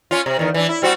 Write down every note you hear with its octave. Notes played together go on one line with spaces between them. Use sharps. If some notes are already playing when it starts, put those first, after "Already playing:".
C#4 F4
C3
E2 D#3
E3 D4
E4
G3 C4 F#4